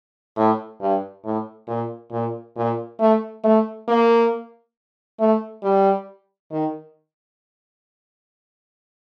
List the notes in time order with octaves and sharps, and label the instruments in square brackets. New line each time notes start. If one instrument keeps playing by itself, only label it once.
[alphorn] A2
G2
A2
A#2
A#2
A#2
A3
A3
A#3
A3
G3
D#3